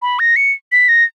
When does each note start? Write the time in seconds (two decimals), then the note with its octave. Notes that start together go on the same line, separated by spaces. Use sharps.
0.02 B5
0.19 A#6
0.36 C#7
0.72 B6
0.88 A#6